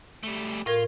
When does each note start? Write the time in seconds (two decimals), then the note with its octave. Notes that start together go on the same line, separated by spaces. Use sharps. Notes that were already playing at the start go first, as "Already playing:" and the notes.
0.23 G3 A3
0.66 A2 F4 A#4 G#6